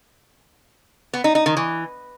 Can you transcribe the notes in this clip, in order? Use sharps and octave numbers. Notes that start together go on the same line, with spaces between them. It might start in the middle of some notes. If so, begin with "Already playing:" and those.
B3
D#4
D#4
D#3
E3